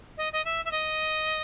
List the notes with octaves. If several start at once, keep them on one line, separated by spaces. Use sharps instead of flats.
D#5
D#5
E5
E5
D#5